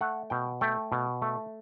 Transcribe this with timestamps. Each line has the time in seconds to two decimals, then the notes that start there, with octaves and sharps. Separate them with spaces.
0.01 A3 F#5
0.30 B2 G5
0.61 A3 G5
0.92 B2
1.22 A3